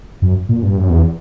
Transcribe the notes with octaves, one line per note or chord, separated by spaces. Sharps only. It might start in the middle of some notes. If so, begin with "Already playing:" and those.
F#2
A#2
G2
F#2
E2